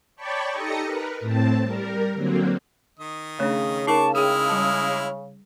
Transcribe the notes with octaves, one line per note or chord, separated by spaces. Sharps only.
C#5 D5 G5 A5 B5 C#6
D#4 G4 A4 D#6 A#6 C#7
A#4 B4
A2 C4 A5
G3 A#4
D3 F#3 A#3 C4
D#3 D#5
C#3 A3 D4
D#4 A#4 A5 C#6 D6
G#3 E4 G#4 G5 D#6 F6
G3 A5